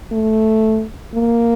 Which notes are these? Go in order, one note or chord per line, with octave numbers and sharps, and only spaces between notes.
A3
A#3